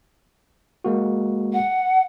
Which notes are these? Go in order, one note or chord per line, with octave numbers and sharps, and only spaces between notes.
G#3 A#3 F#4
F#5